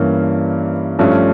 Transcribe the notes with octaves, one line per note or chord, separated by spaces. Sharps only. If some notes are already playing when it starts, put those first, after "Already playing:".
Already playing: G2 E3 A#3 C#4
G2 F3 A3 C#4